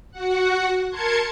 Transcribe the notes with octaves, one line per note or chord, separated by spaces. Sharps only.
F#4 F#5
A#4 A5 C6 G#6 C#7